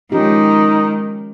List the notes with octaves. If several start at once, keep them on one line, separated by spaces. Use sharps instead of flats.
D#3 F3 G#3 C#4 D#4 G4